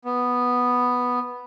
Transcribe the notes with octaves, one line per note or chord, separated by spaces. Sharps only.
B3